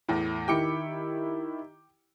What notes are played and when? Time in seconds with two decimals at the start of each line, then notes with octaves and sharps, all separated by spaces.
0.08 E2 A2 E4
0.48 D#3 E4 G4 G5 D6 C#7